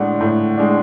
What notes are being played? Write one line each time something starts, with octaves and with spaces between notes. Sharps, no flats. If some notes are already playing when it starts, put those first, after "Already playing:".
Already playing: A2 G#3 D4 F#5
A2
G#3 D4